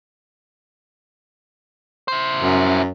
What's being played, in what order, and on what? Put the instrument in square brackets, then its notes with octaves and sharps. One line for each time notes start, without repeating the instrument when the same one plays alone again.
[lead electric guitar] E4 C5
[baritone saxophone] F#2